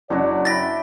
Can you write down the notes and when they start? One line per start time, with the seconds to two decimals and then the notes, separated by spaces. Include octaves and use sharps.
0.10 F#1 F#3 C#4 D4 F#4 D5
0.45 E5 G5 B5 A6 A#6